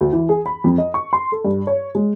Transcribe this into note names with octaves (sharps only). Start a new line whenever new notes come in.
D2
E3
G#4
B5
F2
D#5
C#6
C6
A4
G2
C#5
G#3